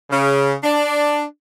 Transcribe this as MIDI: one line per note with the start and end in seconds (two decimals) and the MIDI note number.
0.11 0.54 49
0.64 1.24 62